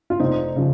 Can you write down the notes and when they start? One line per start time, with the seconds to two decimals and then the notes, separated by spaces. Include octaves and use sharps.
0.10 F4
0.19 F1 C4 D#4
0.56 C#3 F3